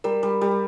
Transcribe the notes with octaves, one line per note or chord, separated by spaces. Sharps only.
G3 A#4
G3
G3